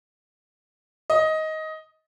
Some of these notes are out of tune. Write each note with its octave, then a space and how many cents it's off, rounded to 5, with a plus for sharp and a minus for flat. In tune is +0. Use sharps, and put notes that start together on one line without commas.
D#5 +15